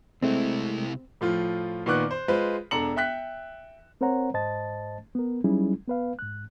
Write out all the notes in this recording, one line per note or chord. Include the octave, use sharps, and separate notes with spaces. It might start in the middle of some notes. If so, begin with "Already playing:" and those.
C3 G#3 A3 C4 E4
A2 F3 F4
A#2 D#3 B3 C#6 D6 F#6
C5
G#3 F4 B4 C5
E1 D4 A4 A#5 C#7 F#7
E5 G5 F#6 B6
C4 A#4 C5 C#5 F#5 A#5
G#2 C5 D#5 A5 A6
B3 A#4
F#3 G3 C#4 D#4 E4 G#4
B3 B4 F5
G#2 F#6